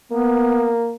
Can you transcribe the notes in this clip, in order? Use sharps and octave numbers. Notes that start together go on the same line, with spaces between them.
A#3 B3